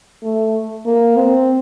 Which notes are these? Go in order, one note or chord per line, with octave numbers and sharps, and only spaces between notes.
A3
A#3
C4